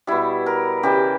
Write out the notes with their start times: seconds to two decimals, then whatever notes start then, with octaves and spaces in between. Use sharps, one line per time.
0.07 B2 G3 E4
0.46 A#4
0.83 C#3 E3 G3 G4